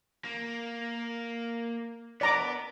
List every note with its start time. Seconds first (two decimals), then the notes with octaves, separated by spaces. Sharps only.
0.25 A#3
2.21 B3 D5 A#5 D6